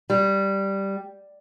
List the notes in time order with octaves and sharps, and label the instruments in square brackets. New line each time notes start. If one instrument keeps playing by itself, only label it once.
[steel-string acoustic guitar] G3